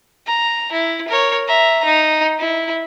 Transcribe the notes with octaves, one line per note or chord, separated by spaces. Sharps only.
A#5
E4
A#4 C#5
E5 A#5
D#4
E4